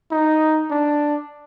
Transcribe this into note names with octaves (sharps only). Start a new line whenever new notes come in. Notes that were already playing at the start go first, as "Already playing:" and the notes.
D#4
D4